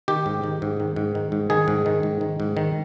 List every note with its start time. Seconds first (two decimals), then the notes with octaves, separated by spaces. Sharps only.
0.08 D#3 G4
0.26 G#2
0.44 D#3
0.62 G#2
0.80 D#3
0.96 G#2
1.15 D#3
1.32 G#2
1.50 D#3 G#4
1.68 G#2
1.86 D#3
2.03 G#2
2.21 D#3
2.40 G#2
2.57 D#3